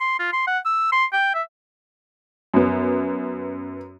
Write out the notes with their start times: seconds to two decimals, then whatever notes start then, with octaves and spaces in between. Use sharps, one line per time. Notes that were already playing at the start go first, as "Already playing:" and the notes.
0.01 C6
0.19 F4
0.33 C6
0.47 F#5
0.65 E6
0.92 C6
1.13 G5
1.34 E5
2.54 F#2 B3